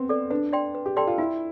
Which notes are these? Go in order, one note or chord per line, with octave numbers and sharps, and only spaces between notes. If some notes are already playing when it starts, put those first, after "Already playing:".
Already playing: B3 C4
A4 D5
D4 B4
D5 G5 C6
B4
G4
A4 D5 G5 C6
F4
E4 F4